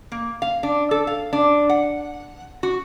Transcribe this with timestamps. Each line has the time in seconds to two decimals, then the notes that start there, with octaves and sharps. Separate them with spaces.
0.12 A#3
0.42 F5
0.63 D4
0.91 A4
1.07 F5
1.33 D4
1.70 F#5
2.63 F#4